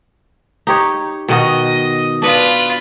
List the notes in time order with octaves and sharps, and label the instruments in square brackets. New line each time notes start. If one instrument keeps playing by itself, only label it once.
[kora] D#4 G4 C#5
[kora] B2 D#3 F#4 [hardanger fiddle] D#5
[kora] D4 D#5 [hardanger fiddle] F4 B4